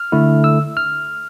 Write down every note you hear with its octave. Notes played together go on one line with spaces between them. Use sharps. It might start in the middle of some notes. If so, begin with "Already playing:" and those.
Already playing: F6
D3 A3 E4
E6
F6